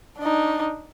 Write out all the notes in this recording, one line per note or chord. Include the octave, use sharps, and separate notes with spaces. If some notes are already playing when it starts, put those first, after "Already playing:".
D4 D#4